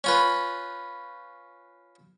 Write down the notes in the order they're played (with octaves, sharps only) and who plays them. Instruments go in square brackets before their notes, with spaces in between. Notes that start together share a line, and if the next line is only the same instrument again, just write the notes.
[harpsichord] C#4 F4 B4